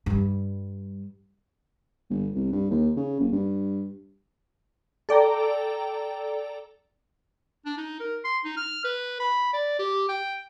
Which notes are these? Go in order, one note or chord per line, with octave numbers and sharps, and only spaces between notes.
G2 G3
G1
C2
G2
D#2
C#3
F#1
G2
A4 D5 G5 A#5
D4
D#4
A#4
C6
D#4
F6
B4
B5
D5
G4
G5